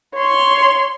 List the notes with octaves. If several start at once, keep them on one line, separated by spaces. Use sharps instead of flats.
C#5 C6